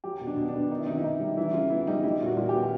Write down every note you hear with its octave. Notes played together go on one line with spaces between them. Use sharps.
F#3 G4
B2
D4
B2
D4
B3
D#3 D#4
E4
C3 D#4
E4
C3 D#4
G3
E3 E4
C#3 F4
B3 E4
G3 D#4
G3 E4
A#2 F#4
A#2
G4
B3